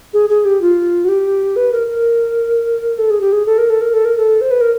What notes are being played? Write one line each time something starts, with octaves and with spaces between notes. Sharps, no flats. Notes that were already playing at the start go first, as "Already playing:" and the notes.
G#4
G#4
G4
F4
F#4
G4
B4
A#4
A#4
A4
G#4
G4
G#4
A4
A#4
A4
A#4
A4
A#4
A4
C5
B4
A#4